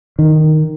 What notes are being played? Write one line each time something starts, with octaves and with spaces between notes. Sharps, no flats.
D#3